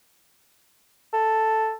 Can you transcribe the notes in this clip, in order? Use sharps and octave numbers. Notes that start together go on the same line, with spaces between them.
A4